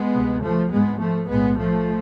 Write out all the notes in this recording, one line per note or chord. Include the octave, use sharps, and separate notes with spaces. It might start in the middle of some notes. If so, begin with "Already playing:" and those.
Already playing: G#3 B3
D2 C3
F3 A3
G#1 G#2 G#3 B3
F3 A3
B1 A2 G#3 B3
F3 A3